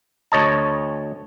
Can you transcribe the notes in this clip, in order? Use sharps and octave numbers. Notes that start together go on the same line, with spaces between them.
D2 C#5 D#5 A5